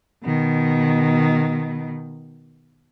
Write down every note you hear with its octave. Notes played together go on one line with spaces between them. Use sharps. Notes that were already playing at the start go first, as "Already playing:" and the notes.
B2 D#3